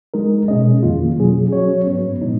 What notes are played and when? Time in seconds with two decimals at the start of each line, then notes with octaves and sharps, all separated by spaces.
0.14 G#3 D#4 A#4
0.48 B2 G#3 C#4 G#4 D#5
0.83 F2 D#3 A#3 F4
1.17 B2 F#3 C#4 G#4
1.53 F#3 C#4 F#4 C#5
1.87 G#2 F#3 B3
2.22 A#2 F3 G#3 D#4